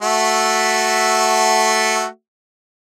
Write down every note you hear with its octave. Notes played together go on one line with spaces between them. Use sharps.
A3 F#4 E5